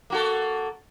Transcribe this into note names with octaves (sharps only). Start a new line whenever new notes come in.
A#3 F#4 A4